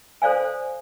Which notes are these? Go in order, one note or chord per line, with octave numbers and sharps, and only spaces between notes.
A4 C5 D5 F5 G#5